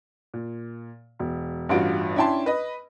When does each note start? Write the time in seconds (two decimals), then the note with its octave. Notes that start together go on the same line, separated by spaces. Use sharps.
0.34 A#2
1.19 E1
1.69 A1 G2 F4 F#4 D7
2.16 C#4 D4 E4 G5 A5 C6
2.46 B4 D#5